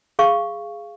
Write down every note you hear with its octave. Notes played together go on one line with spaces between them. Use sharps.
G#4 F5 C#6